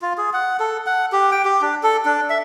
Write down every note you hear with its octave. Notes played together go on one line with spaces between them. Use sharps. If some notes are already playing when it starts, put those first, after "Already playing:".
F4
G#4
F#5
A4
F#5
G4
G5
G4
D4
A4
D4
E5